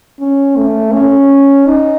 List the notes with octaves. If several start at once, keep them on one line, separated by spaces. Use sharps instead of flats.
C#4
A3
C#4
D#4